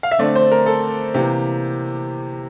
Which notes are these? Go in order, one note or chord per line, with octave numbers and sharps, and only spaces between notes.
F5
E5
D3 A3 C4 D5
C5
A#4
A4
C3 E3 A#3 G4